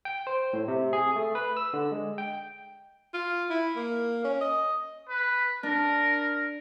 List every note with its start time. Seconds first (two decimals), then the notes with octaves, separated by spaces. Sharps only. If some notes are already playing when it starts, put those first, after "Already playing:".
0.05 G5
0.27 C5
0.53 A2
0.68 C3
0.93 G#4
1.16 A3
1.35 B4
1.57 E6
1.73 D3
1.92 G#3
2.18 G5
3.14 F4
3.50 E4
3.76 A#3
4.24 C#4
4.41 D#5
5.09 B4
5.63 D4 A#4